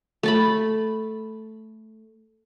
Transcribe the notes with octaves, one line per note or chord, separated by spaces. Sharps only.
A3 A5 B5